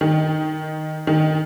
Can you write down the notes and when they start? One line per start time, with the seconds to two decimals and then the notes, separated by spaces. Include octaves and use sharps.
0.01 D#3
1.07 D#3